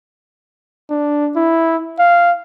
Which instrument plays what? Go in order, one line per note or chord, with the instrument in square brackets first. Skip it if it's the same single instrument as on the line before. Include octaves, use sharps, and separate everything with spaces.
[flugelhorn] D4
E4
F5